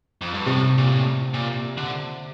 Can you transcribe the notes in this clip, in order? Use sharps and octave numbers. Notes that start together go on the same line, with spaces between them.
F2
G2
A2 C3
A#2
A2
A#2
D3